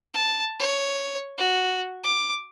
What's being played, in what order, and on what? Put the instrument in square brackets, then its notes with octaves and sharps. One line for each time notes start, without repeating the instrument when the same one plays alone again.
[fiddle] A5
C#5
F#4
D6